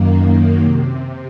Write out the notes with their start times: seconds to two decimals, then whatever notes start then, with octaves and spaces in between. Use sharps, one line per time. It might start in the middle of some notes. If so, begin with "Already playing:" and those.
Already playing: F#2 D#3 A#3
0.62 C3